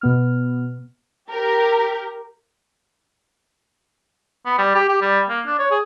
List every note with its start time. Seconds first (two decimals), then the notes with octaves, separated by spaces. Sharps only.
0.01 B2 B3 F6
1.30 G4 A#4
4.46 B3
4.58 G3
4.75 G4
4.89 G4
5.02 G3
5.29 A#3
5.46 D4
5.59 C#5
5.72 G#4